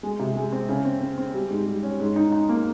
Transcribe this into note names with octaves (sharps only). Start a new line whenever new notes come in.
G#3
C3
G#3
C4
C#3
C4
C4
C4
G3
G#2
G3
C#4
G#2
D#4
D#4
A#3